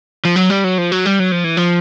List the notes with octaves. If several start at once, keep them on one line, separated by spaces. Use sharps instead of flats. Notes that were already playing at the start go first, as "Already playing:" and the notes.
F3
F#3
G3
F#3
F3
F#3
G3
F#3
F3
E3
F3